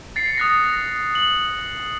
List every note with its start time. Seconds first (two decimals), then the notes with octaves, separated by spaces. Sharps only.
0.16 A6 C7 C#7
0.38 D#6 F#6 A#6
1.15 F#7